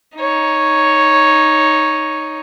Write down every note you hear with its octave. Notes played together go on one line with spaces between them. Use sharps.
D#4 C#5